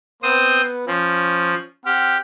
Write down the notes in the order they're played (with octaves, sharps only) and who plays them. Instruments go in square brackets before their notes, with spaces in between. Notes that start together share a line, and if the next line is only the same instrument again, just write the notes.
[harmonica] B3 [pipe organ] C4 C5 D#6
[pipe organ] F3 [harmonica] C#4
[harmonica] C4 F#5 F6 [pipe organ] G4